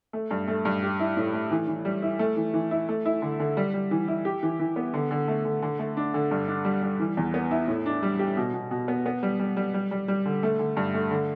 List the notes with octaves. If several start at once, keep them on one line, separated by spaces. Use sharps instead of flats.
A3
G2
A3
G2
G4
E4
A2
A3
E3
E3
G3
E4
A3
E3
E3
E4
A3
E4
D3
D3
G3
G3
E3
E4
G4
E3
E3
B3
D3
D3
A3
D3
D3
A3
D4
D3
G2
D4
G3
G3
E3
E2
B3
E4
A2
D4
G3
G4
B2
B2
B2
B3
B3
G3
G3
G3
G3
G3
G3
D3
A3
D3
G2
A3
D3